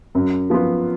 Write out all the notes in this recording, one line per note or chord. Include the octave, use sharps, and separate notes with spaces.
F#2
F3 B3 F4